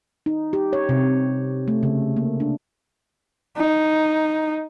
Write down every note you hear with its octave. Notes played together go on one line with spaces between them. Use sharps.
D#4
G4
C#5
C3
A3
C#3
A#3
D4
D#4